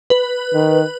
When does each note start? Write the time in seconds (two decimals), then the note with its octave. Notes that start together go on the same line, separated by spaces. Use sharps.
0.10 B4
0.53 D#3